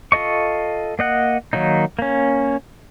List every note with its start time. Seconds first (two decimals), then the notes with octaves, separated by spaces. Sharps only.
0.12 F4 A4 D#5 C#6
0.99 A#3 D#5 F#5
1.53 D#3 F#3 A#3 D#4
1.99 A#3 C#4